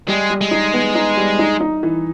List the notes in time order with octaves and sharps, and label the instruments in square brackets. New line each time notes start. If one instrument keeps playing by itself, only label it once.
[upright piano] G3 [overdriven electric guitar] G#3
[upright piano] G3
[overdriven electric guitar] G#3
[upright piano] D#4
B3
D#4
G3
D#4
D#4
E3